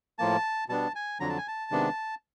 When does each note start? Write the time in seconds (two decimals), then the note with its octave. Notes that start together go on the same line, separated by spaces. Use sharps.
0.19 A2 F3 A#3 A5
0.69 B2 G3 B3 D4 A5
0.95 G#5
1.20 F2 D3 F#3 A#5
1.29 A5
1.38 G#5
1.48 A5
1.71 C3 D#3 G#3 B3 D4